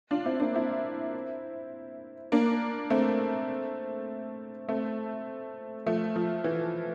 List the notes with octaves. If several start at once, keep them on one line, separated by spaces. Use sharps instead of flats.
D4 F4
C4 E4
A#3 D4
C4 E4
A#3 D4
A3 C4
A3 C4
F3 A3
F3
E3